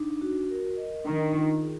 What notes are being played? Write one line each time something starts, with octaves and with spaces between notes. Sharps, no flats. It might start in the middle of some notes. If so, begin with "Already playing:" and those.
Already playing: D4 D#4
F#4
A#4
D#5
D#3 D4
F4
G#4